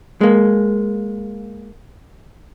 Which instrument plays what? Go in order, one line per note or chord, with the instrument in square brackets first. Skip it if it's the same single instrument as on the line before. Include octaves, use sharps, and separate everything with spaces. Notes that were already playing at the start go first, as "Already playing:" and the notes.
[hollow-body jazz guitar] G#3 A#3